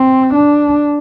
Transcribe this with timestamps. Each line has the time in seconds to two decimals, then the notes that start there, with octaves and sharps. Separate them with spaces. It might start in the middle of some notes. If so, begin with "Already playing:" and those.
Already playing: C4
0.34 D4